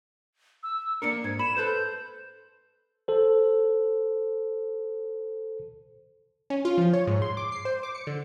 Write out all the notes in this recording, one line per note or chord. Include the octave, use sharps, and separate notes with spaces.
E6
A#3 D4 A#4 C#7
G#2 G#6
B5 E7
A4 B4 C5 G6
A4 C5
C#4
F4
F3
C#5
G#2
C6
D6
C7
C5
D6
C#7
D3